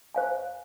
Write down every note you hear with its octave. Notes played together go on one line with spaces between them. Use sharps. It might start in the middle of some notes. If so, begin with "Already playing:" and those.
C5 F5 G#5